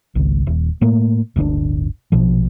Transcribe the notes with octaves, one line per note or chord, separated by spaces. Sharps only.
G#1 C#2
D#1
A2 A3 A#3
D1 G1 C#4 D4
A#1 B2 F3